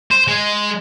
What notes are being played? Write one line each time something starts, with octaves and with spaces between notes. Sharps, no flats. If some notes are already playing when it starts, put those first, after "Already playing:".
C5
G#3